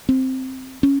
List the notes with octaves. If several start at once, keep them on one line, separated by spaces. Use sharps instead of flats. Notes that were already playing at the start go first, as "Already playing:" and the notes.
C4
C#4